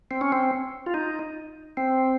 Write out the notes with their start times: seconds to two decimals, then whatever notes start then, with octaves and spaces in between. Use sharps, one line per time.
0.11 C4
0.21 C#4
0.32 C4
0.86 F4
0.94 D#4
1.77 C4